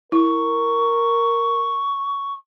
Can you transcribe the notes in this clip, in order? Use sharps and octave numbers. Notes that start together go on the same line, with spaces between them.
E4 A#4 C#6